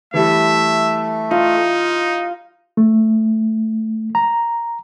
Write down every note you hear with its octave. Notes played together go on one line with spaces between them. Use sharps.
E3 G3 A3 E5
D#4 F4
A3
A#5